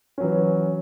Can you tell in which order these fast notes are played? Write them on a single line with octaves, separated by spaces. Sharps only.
C#4 F#3 E3